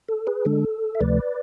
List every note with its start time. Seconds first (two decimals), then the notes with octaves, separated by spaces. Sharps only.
0.08 A4
0.27 G#4 B4
0.45 D3 G#3 D4 A4
0.95 E5
1.00 D2 C3 F3 A3 B4 D5